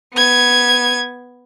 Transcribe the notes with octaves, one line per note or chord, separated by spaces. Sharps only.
B3 G#6